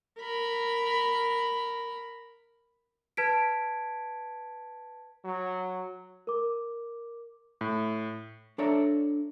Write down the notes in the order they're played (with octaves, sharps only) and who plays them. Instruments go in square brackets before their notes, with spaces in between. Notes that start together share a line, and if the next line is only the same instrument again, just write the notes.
[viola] A#4 B5
[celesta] B4 A5 G#6 B6 D7
[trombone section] F#3
[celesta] A#4 D6
[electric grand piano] A2
[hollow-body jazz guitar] D4 A4 C#5 D5 E5 A#5